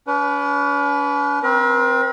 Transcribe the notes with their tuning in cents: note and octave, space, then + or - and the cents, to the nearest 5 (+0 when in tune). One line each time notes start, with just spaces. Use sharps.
C#4 +45 B4 +0
C4 +0 A#4 +45